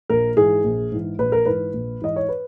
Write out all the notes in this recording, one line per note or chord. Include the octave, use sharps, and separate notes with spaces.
A#1 A#4
G#2 E3 G#4
A#1
G#2 E3
A#1 B4
A#4
G#2 E3 B4
A#1
G#2 E3 D#5
C#5
B4